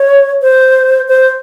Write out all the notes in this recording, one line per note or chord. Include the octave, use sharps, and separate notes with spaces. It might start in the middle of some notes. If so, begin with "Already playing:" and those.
Already playing: C#5
C5
C5